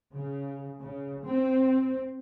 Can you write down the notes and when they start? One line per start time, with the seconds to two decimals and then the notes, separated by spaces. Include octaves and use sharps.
0.14 C#3
0.79 C#3
1.25 C4